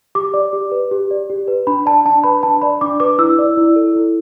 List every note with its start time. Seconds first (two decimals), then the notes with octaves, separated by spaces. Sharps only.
0.15 G4 D6
0.34 D5
0.53 G4
0.72 B4
0.91 G4
1.11 D5
1.30 G4
1.48 B4
1.67 D4 B5
1.86 D5 A5
2.05 D4 A5
2.24 B4 B5
2.43 D4 A5
2.61 D5 B5
2.81 D4 D6
3.00 B4 D6
3.18 E4 E6
3.39 D5
3.57 E4
3.76 A4
3.96 E4